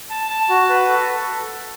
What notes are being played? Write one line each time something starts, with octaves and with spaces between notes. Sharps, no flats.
A5
A5
F#4
B4
A4
A4